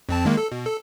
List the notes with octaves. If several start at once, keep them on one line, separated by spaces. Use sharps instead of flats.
F2 C4 A5
D#3 G#3 A#3
A4
B2
A4